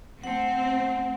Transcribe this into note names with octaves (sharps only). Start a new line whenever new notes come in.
A3 C4 F#5